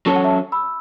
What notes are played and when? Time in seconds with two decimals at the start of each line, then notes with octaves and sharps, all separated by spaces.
0.06 F#3 C#4 A4 C#5 A5
0.16 F#5
0.24 E5 A5
0.52 B5 E6